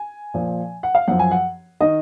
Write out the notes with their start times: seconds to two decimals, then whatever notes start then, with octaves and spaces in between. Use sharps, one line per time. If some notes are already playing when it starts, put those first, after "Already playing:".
Already playing: G#5
0.34 A#2 F3
0.83 F#5
0.95 F5
1.08 F#2 F3 F#5
1.19 G#5
1.31 F#5
1.80 D#3 D#5